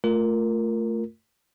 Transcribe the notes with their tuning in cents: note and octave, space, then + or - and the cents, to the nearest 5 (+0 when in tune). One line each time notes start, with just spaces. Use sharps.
A3 +10 F4 +0 A#4 +0